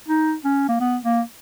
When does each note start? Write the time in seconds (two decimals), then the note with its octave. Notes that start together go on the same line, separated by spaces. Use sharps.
0.08 D#4
0.44 C#4
0.68 A#3
0.80 B3
1.04 A#3